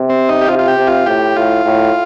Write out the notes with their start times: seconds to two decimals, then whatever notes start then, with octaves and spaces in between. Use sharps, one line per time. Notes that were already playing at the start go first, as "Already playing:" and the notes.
Already playing: C3
0.09 C4
0.29 D#4
0.41 G4
0.48 C3 F4
0.59 F4
0.68 G4
0.78 C3
0.87 F4
1.06 A2 G4
1.36 A2 F4
1.65 A2